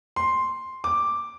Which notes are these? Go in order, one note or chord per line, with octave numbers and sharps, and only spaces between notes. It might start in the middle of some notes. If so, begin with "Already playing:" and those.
C6
D6